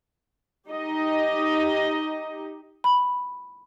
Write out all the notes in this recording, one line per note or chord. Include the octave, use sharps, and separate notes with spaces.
D#4 G4 D#5
B5